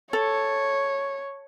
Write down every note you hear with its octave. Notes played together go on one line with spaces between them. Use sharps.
A4 C#5